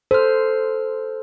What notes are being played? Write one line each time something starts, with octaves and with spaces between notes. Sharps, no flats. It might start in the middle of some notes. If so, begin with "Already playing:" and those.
A4 C5 F6